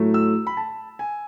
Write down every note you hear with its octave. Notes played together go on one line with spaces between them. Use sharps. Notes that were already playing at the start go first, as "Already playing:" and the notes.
Already playing: A2 F#3 A3
E6
B5
A5
G#5